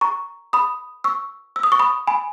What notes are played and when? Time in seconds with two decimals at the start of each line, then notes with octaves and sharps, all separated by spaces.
0.01 A#5 C#6
0.53 B5 D#6
1.04 C#6 E6
1.56 E6
1.63 D#6
1.72 C#6
1.79 B5 D#6
2.07 G#5 B5